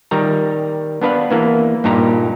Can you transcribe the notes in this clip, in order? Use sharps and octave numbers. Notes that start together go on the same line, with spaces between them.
D#3 G3 A#5
B3 D4 B4 F5
E3 A#3 B3
G2 A#2 D#4 G4 A#5